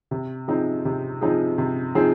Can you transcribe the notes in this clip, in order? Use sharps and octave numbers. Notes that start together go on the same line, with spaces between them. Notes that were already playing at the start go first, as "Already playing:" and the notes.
C3
F3 C4 D#4 G#4
C3
F3 C4 D#4 G#4
C3
F3 C4 D#4 G#4